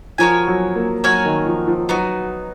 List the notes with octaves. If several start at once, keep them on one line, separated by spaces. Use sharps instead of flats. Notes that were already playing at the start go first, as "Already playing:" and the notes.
F3 F#4 A#4 C#5 G#5
F#3
A#3
F#3 F#4 A#4 C#5 G#5
D#3
F3
F3
F#3 B3 D#4 F#4